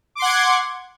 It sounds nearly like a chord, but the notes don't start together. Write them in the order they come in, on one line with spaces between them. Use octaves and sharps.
D6 C6 F#5 G#6